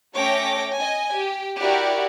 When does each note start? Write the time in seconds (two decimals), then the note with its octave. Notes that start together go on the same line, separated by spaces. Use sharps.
0.16 A3 C#4 C#5 G5 D6 A#6
0.78 D#5 G#5
1.16 G4
1.59 E4 F#4 G4 A#4 D5